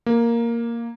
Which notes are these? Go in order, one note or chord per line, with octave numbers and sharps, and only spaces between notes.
A#3